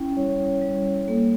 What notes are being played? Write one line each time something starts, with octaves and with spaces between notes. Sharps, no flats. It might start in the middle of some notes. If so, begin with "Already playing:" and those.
Already playing: C#4 E4 G5
G3 C#5
G3
A#3 A4